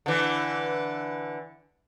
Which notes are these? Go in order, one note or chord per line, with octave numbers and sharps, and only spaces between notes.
D3 E3